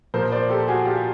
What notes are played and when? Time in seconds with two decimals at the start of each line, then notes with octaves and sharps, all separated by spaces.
0.14 A#2 F3 A#3 A#4 C5
0.32 C5 D5
0.49 G4 A4
0.68 F#4 G#4
0.85 F4 G4